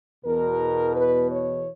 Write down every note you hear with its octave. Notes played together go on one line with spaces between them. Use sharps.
E2 B2 A#4
B4
C#5